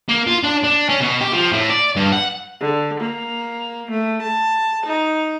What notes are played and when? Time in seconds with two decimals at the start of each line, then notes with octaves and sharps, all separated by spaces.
0.09 A#3
0.27 F4
0.44 D4
0.64 D4
0.89 C#4
1.00 B2
1.21 G4
1.33 F3
1.52 A2
1.69 D5
1.96 G2
2.12 F#5
2.61 D3
3.00 A#3
3.91 A3
4.22 A5
4.86 D#4